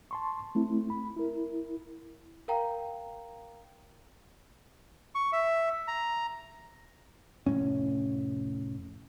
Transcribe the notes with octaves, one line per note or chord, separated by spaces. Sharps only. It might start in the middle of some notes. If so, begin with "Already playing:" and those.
A5 C6 C#6
A3 C4 E4
B5
E4 A#4
A#4 F5 G5 A#5
C#6
E5
A#5
F1 A#1 A2 C#4